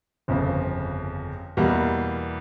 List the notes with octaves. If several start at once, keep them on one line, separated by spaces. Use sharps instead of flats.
G1 F2 C#3
E2 B2 G3 A#3